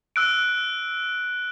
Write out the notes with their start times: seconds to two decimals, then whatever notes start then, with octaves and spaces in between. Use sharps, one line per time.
0.16 E6 F#6 D7